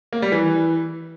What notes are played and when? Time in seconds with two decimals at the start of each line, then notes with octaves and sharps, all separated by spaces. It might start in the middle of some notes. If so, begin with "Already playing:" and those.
0.13 A#3
0.22 G3
0.32 E3